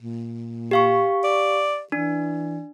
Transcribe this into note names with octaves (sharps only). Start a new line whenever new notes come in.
A#2
G4 F5 C#6
D5
E3 D4